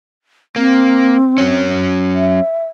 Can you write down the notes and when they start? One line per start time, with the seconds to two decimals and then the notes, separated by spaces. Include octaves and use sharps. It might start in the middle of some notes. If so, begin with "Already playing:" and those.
0.56 A#3 C4
1.38 F#3 C#4
2.15 E5